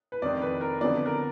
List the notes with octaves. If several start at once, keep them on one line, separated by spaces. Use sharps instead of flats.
B4
F1 F2 D#3 D5
B4
A#4
F2 D3 F#3 B3 D5
B4
A#4